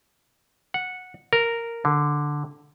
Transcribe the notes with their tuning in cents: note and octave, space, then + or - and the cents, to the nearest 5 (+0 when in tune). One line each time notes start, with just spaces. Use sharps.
F#5 -10
A#4 -5
D3 +0